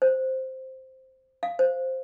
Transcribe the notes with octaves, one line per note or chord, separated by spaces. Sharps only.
C5
F5
C5